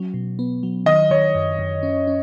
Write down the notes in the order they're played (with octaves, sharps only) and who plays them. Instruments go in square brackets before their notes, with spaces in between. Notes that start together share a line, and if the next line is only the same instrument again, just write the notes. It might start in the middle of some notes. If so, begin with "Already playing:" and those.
Already playing: [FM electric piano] F#3 C#4
B2
B3
F#3
[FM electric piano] D#3 [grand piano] D#5
[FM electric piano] D#3 [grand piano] C#5
[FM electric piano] F#2
F#2
C#4
C#4